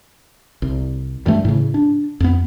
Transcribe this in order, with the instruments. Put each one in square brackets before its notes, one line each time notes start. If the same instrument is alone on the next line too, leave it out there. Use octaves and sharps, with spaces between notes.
[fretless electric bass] C2
G2 E3 A3
A2 C#3
D4
F2 B3